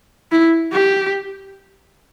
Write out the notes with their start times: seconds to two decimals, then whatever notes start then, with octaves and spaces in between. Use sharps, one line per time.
0.32 E4
0.72 G4